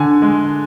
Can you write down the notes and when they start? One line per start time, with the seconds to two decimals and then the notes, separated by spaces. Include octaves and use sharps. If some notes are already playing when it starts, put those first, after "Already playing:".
Already playing: D3 G#5
0.22 G#3